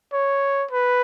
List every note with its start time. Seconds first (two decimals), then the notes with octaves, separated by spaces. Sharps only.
0.13 C#5
0.71 B4